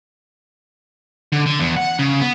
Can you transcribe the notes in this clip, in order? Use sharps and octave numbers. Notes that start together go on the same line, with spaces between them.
D3
D3
E2
F#5
C#3
B3